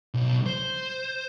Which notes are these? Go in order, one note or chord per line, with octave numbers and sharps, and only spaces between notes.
B1
C5